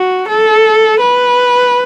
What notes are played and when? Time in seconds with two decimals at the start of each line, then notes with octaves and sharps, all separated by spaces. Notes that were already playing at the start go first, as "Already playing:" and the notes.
Already playing: F#4
0.28 A4
1.00 B4